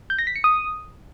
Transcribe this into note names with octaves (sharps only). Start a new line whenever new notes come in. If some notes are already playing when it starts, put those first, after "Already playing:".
G6
A#6
B6
C#7
D#6